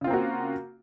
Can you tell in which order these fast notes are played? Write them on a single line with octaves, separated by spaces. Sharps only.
C#3 F4 C4 A#3 F#4